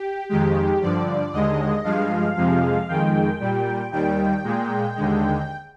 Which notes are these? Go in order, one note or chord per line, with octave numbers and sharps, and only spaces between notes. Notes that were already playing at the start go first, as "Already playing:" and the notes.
Already playing: G4
F2 D#3 G#3 G4
G2 D3 F3 D5
D#2 D3 G#3 D#5
G2 F3 G#3 F5
F2 C3 F3 G#3
F2 D#3 G#3 G5
A#2 G3
D#2 D#3 G3 G5
A#2 G#3
D#2 D3 G#3